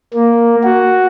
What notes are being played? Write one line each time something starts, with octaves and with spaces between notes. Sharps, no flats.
A#3
F#4